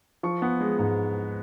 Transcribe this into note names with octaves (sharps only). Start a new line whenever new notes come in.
F3 C#6
B3
G#3
G#2